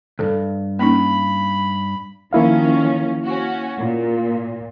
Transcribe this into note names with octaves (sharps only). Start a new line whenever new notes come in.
D2 G2 A4
A#3 C#4 D#4 B5
D#3 F3 A#3 C#4 E4 F5
C#4 F#4
A#2